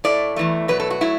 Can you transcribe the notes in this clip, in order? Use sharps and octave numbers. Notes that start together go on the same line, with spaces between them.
A2 A3 D5
E2 E3 A3
B2 F#3 A3 B4
A4
F#4
F#3 A3 E4